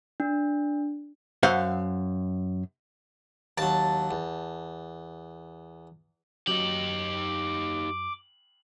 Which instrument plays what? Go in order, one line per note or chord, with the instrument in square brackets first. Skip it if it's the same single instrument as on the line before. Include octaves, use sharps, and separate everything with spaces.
[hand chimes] D4
[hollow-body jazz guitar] F#2 C5 F5 F#5
[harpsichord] D#2 F#3 [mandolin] A5
[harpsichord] E2
[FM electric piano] F#2 F#3 [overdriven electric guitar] D#4 G4 [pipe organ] D6 [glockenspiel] F#7